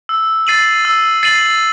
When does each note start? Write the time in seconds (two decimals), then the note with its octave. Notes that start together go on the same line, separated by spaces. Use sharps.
0.09 E6
0.47 A6 C7 D#7 F#7
0.85 E6
1.23 A6 C7 D#7 F#7